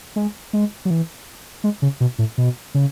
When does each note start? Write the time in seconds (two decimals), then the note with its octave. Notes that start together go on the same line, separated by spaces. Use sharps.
0.16 G#3
0.53 G#3
0.85 F#3
0.90 E3
1.64 G#3
1.82 C#3
2.01 B2
2.19 A2
2.38 B2
2.74 C#3